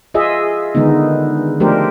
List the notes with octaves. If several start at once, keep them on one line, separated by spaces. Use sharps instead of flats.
F4 G#4 D#5 E5
D3 D#3 G#3 B3 D#4
F3 A3 D4 G4 A#4 C5